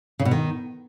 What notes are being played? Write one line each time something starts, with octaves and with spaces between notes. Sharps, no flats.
C#3
B2
D#3